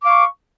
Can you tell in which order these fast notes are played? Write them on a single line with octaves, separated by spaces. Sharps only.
D6 F5 C#6